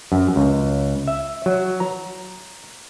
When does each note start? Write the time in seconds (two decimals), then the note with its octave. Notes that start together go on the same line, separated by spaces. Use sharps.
0.12 F#2
0.36 C#2
1.08 E5
1.46 F#3
1.80 A#5